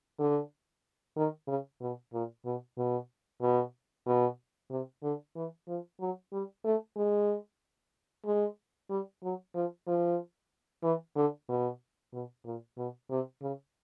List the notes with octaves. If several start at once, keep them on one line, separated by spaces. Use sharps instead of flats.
D3
D#3
C#3
B2
A#2
B2
B2
B2
B2
C3
D3
E3
F3
F#3
G3
A3
G#3
G#3
G3
F#3
F3
F3
E3
D3
B2
B2
A#2
B2
C3
C#3